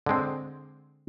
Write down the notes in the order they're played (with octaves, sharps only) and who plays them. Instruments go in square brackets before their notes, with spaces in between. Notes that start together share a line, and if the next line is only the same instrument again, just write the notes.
[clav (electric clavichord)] D3 G#3 C4